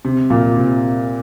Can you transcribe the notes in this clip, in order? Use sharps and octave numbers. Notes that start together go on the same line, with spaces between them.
C3
A#2
C3